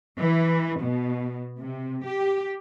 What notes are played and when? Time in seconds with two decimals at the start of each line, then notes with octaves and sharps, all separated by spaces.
0.19 E3
0.82 B2
1.58 C3
2.05 G4